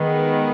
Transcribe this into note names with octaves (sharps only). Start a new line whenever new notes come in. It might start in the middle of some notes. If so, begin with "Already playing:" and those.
Already playing: D#3 G#3 B3